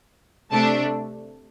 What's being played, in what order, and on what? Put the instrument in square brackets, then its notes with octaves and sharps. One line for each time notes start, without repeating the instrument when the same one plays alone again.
[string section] C3 A3 D4 A5